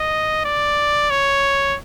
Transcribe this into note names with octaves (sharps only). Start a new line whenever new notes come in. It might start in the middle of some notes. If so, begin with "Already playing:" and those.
Already playing: D#5
D5
C#5